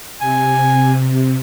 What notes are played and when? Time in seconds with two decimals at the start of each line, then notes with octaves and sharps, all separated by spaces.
0.21 C3 G#5